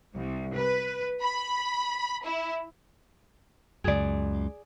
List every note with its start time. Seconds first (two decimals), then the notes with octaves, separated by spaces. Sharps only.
0.14 C2
0.55 B4
1.21 B5
2.25 E4
3.84 C#2 F#2 G#4 D5